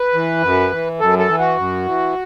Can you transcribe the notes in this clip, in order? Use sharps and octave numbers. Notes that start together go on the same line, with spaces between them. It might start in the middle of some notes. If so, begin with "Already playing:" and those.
Already playing: B4
E3
F#2
E3
F#2 A4
A4
E3
F#4
F#2
E3